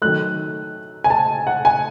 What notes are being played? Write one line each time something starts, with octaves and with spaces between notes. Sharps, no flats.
D#3 F#3 A3 F#6
G#5
A5
F#5
G#5